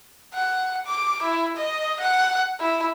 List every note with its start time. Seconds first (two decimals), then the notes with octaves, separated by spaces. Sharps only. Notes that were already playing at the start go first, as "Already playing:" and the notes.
0.34 F#5
0.86 D6
1.23 E4
1.57 D#5
2.00 F#5
2.60 E4